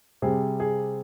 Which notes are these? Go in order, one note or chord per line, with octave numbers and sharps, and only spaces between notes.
C3 G3 C4 G#4
G#4